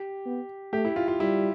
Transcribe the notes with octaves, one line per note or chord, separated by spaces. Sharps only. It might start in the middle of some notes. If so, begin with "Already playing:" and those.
Already playing: G4
B3
A3 G4
E4
F4
F4
G3 E4